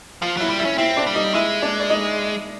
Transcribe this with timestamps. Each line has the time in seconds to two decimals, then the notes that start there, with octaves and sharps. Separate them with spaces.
0.22 F3 F4 F5
0.37 F#3 E4 E5
0.50 G3
0.59 E4 E5
0.65 C#4
0.78 C4 E4 E5
0.97 D4 D5
1.07 G3
1.15 D#4 D#5
1.34 G#3 E4 E5
1.62 D4 D5
1.80 D5
1.90 D#4 D#5